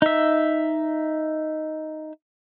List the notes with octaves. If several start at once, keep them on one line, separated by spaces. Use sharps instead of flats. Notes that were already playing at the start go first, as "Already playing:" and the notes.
D#4 E5